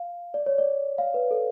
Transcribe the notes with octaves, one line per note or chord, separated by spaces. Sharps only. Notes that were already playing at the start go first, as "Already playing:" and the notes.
Already playing: F5
D5
C#5
D5
F5
B4
A4